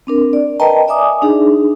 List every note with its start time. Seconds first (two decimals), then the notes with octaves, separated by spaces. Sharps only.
0.07 C4 D4 A#4
0.33 D5
0.60 A#4 B4 D#5 G5 A5 A#5
0.88 D5 E5 G#5 D6 D#6
1.22 D4 D#4 G#4